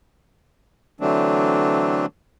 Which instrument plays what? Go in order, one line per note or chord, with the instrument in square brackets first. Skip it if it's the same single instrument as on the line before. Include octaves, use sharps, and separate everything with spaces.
[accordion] D3 E3 F#3 A3 C4 D4